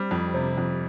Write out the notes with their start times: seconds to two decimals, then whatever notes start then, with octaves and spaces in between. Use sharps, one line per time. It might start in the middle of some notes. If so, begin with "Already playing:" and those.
Already playing: G3 C4
0.11 F2
0.34 C3
0.58 F2